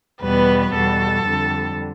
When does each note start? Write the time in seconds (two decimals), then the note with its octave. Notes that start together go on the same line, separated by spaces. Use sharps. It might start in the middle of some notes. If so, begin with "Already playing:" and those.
0.21 E2 B2 G3 B3 B4
0.73 E2 B2 G3 A4
1.25 F2 D3 G3